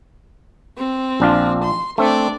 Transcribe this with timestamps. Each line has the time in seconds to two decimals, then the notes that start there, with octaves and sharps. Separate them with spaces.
0.78 C4
1.20 A#1 D4 F4
1.63 C6
1.98 A3 C4 D4 D5